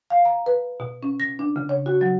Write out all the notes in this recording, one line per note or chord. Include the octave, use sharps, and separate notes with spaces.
F5
A#5
B4
B2
C#4
A#6
D4
C#3
C#5
F#4
F#3